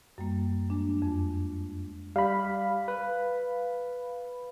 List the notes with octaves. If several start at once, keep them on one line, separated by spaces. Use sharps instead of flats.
F#2 G3 A#3
G#3 D4
F2
G3 F5 B5
B4